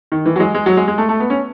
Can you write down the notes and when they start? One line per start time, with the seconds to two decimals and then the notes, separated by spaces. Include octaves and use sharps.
0.12 D#3
0.26 E3
0.36 F#3
0.40 G#3
0.55 G#3
0.66 F#3
0.77 G#3
0.88 G#3
0.98 A3
1.09 A3
1.20 B3
1.30 C#4